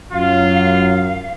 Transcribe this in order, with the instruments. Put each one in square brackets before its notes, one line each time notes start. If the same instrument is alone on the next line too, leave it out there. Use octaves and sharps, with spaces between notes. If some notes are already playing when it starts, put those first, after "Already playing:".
[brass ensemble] F#2 F#3 [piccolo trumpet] F4 [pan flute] F5